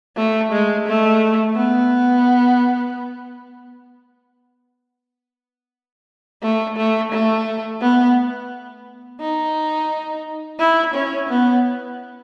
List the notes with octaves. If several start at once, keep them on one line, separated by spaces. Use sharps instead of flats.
A3
G#3
A3
B3
A3
A3
A3
B3
D#4
E4
C#4
B3